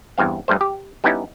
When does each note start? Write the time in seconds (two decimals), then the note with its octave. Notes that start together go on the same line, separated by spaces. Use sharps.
0.18 E2 G2 C4 F5
0.48 G2 G3 A3 C5
0.61 G4
1.04 G3 B3 C#4 D#4 E4